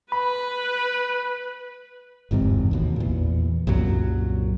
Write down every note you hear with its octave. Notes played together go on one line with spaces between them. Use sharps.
B4 B5
G1 E2 G#2 C3
A1 D#2 B2
E2 A#2
C2 F#2 A#2 F#3